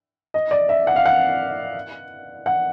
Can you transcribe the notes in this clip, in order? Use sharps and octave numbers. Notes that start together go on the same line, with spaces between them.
D#5
D5
E5
F#5
F5
F#5
F#5